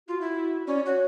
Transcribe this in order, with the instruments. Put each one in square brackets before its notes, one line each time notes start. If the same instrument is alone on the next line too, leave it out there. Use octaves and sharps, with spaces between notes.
[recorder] F4 [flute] F#4
[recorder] E4
[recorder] C#4 [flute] D5
[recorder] F#4 [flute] C#5